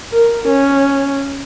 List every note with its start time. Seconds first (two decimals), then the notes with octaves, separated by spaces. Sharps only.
0.12 A#4
0.48 C#4